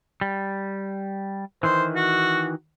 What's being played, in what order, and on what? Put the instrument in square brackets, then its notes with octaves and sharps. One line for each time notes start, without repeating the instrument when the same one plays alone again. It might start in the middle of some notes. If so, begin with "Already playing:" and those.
[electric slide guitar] G3
[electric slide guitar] D#3 E3 [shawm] C5
[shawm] F#4